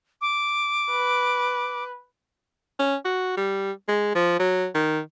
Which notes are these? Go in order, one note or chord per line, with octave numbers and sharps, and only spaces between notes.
D6
B4
C#4
F#4
G3
G#3
F3
F#3
D#3